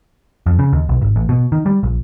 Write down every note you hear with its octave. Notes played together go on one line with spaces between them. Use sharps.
F2
C#3
D#2
B1
G#1
A1
B2
D#3
G3
A#1